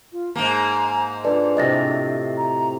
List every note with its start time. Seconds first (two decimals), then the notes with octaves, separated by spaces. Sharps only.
0.12 F4
0.36 G#2 A#3 A5 A#5
1.25 D4 F4 A4 B4 D5
1.57 A2 C3 D#5 G5 A6 A#6
2.37 A#5